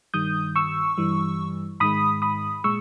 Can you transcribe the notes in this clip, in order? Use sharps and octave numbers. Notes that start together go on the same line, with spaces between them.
G2 D#3 G3 D#6 G6
C#6 E6
G2 E3 G3
G#2 D#3 G#3 B5 D#6
B5 D#6
A#2 G#3 C#6 E6